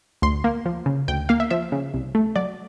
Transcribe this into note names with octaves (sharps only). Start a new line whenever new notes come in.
D2 C6
A#3
F3
C#3
D2 G5
A#3 F5
E5
F3 E5
C#3
C2
A3
F#3 D5